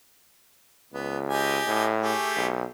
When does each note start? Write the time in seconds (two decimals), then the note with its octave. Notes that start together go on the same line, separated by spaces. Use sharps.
0.93 C#2 B3
1.29 G4 D#5 G#5
1.67 A2
2.02 A3 G4 G#4
2.36 B1